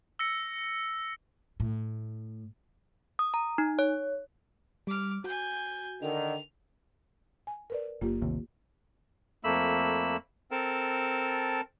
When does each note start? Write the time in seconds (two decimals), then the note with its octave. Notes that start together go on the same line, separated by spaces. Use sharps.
0.19 E6 A#6 C#7
1.60 A2
3.19 D#6
3.34 A#5
3.58 D#4
3.79 C#5
4.87 G3 D6 F6
5.24 F#4 G#5 G6
6.02 D3 D#3 F7
7.47 G#5
7.70 A#4 B4 D5
8.01 F#1 A#3 F4 G4
8.22 A1 D#2 C3
9.44 F2 A3 A#3 B5 E6
10.51 C4 A4 A#4 A5